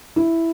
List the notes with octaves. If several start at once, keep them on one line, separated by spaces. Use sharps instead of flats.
E4